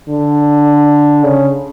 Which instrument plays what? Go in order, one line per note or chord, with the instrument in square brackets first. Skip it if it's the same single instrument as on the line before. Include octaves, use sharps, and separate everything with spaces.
[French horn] D3
C#3